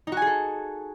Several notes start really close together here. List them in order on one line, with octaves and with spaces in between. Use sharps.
D#4 F#4 G#5 G#4 A4